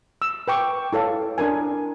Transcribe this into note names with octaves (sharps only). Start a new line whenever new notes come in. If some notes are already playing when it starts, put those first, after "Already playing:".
E6
B4 G5 C#6 D6 E6
E4 A4 C#5 F5
D4 E4 A#4 G#5